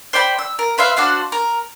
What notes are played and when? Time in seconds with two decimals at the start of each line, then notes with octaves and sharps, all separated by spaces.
0.13 C5 D5 G5 B5
0.39 E6
0.59 A#4
0.78 B4 C5 E5 F5
0.96 D4 F#4 C5 F5
1.32 A#4